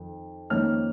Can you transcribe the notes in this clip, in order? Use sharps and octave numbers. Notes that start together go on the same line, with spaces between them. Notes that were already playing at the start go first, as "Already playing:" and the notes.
Already playing: F2 D#3
F2 D#3 A#3 C#4 F6